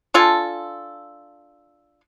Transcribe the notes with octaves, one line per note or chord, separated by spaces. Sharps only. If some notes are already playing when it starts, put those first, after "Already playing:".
D4 F4 A4 G#5